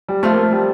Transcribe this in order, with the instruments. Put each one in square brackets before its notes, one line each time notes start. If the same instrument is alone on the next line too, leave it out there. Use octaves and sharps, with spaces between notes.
[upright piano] G3
[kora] F3 C4 F4 [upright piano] A3
[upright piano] A#3
A3
G3